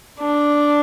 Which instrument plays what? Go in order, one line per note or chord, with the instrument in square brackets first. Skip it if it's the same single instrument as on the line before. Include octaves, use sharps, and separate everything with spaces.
[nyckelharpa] D4